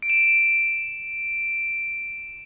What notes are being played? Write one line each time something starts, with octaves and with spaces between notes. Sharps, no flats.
D7
E7